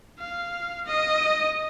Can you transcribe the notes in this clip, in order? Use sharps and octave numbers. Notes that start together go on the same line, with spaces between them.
F5
D#5